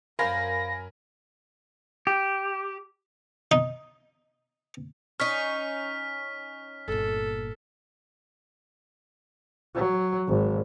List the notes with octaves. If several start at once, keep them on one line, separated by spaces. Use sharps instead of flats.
F#2 A#4 C5 F5 G#5 B5 A#6
G4
D#4
C#4 D#4 F6 B6
G1 A#2 A4
F#3
G#1